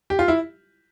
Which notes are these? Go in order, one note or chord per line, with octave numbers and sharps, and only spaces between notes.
G4
F4
E4